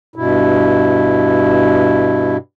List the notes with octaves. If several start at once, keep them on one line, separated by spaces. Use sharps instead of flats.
G2 B2 E4